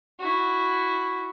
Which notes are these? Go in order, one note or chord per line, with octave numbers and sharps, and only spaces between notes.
E4 F#4